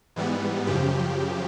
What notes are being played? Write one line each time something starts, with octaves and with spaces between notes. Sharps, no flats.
G#2 E3 G3 B3
F#2 C#3 F3 G4